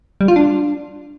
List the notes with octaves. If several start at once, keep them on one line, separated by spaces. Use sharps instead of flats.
G3
F4
D4